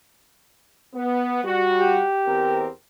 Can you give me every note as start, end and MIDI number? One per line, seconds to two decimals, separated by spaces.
0.94 1.41 59
1.44 2.02 55
1.44 2.02 66
1.79 2.70 67
2.26 2.67 40
2.26 2.67 60
2.26 2.67 70